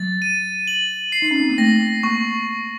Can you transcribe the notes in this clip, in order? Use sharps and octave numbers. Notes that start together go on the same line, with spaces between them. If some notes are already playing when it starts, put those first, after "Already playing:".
Already playing: F#3 A6
D#7
F#7
C7
D#4
C#4
C4
A#3
A3 A#6
A#3 C#6